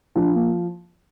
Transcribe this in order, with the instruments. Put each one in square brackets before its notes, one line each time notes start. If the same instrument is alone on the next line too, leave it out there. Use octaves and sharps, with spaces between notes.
[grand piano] F3 [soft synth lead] D4
[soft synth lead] A#3